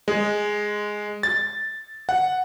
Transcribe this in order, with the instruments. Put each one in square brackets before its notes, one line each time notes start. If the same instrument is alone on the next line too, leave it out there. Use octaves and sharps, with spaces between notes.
[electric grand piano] G#3
A6
F#5